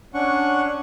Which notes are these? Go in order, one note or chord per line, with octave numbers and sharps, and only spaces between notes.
C#4 D4 F#5 C#6